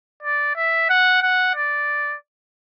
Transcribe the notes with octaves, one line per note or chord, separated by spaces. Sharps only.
D5
E5
F#5
F#5
D5